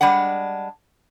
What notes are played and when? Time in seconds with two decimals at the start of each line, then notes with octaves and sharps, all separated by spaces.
0.01 G3 G#3 D4 F#5